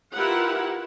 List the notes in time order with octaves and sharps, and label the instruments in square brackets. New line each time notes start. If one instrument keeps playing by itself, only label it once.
[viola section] E4 F4 G4 A#4 B4 F#5